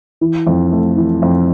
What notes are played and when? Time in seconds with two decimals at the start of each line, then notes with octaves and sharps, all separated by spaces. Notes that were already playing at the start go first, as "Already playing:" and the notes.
0.21 E3
0.47 F2
0.72 A3
0.97 E3
1.22 F2